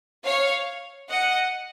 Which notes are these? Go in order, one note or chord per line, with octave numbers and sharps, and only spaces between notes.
C#5 F5
D#5 F#5